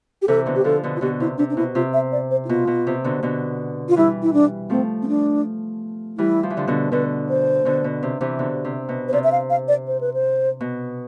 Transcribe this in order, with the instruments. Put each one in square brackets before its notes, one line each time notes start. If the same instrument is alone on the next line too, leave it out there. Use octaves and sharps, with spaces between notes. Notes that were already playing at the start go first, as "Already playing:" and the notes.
[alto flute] G4
[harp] C3 E3 [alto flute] A4
[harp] B2 D3
[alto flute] G4
[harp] D3 F3 [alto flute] A4
[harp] B2 D3
[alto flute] F4
[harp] B2 D3 [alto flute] G4
[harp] C3 [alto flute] E4
[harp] C3 [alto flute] D4
[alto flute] D4
[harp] B2 [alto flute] E4
[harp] C3 [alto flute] F4
[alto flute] E5
D5
C5
E4
[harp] B2 [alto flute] F4
[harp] B2
C3
B2 D3
B2 D3
[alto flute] F4
[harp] E3 G3 [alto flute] E4
[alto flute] E4
D4
[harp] F3 A3 [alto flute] C4
[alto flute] C4
D4
[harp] E3 G3 [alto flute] E4
[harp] F3
E3
D3 F3
B2 D3
[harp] B2 D3 [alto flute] B4
[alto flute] C5
[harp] B2 D3
B2
C3
C3 E3
B2 D3
C3
B2
[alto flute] C5
[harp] C3 [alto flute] D5
[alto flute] E5
F5
F5
D5
C5
B4
C5
[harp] B2